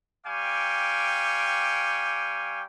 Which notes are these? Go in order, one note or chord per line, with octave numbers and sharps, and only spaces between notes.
G3 F5 G5 G#5 C#6 D6